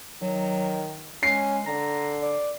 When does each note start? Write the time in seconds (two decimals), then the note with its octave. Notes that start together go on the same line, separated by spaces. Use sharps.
0.22 D#3 F#3
1.23 G#3 C#4 C7
1.66 D3 A#5
2.23 D5